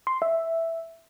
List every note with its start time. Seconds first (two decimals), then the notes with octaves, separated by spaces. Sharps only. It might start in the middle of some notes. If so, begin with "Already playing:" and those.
0.07 C6
0.22 E5